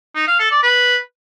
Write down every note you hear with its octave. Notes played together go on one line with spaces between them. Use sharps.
D#4
F5
A4
D5
B4